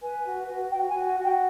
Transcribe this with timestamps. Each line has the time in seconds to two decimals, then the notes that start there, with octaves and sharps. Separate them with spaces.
0.01 B4 G#5
0.24 F#4
0.46 F#4
0.70 F#4 G5
0.88 G#5
0.94 F#4
1.05 G#5
1.18 F#4
1.23 G5